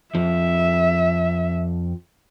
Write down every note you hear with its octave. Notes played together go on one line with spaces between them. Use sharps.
F2 F3 E5